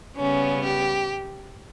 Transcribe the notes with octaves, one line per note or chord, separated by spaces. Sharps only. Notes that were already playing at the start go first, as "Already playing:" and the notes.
C#3 G3 B3 C#4
G4